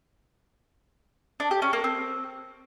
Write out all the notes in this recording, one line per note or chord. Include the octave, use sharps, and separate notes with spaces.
D4
G4
C#4
A#3
C4